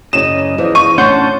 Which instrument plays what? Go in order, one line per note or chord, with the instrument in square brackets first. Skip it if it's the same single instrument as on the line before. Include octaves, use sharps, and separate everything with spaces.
[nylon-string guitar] F#2 C#3 D5 [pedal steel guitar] D#5 [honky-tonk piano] E7
[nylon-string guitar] E2 E3 F3
[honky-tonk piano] C#6 [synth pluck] D#7
[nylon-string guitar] A2 C#5 [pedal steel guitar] C#4 D4 A5 [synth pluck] F#5 C6 G6